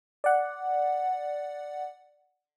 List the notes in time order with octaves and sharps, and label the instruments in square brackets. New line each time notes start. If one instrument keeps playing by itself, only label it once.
[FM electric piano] D5 F#5